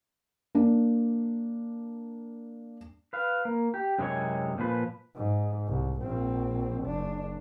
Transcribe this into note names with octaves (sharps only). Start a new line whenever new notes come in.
A#3 D4
B4 F5
A#3
G4
F#2 C3 G#3 D4 E4 C#5
A#2 F3 B4
G#2
C2
A#1 C4
F#1 D4